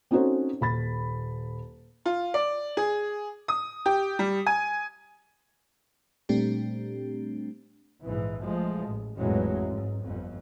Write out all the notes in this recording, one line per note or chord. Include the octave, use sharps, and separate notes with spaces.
C4 C#4 D#4 F#4 A4 C5
D#1 B5 A6
F4
D5
G#4
D#6
G4
G3
G#5
A#2 G3 A3 C4 D4 G4
A#1 G#2 E3
F3 G#3 A3
A1
A1 F2 A2 E3 F#3 G#3
G#2
G1 F2